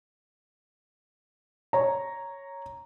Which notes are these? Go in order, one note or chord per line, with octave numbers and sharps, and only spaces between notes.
C#5 A#5